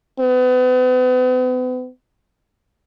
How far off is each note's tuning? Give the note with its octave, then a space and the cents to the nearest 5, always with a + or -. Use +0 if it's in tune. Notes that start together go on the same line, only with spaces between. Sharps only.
B3 +40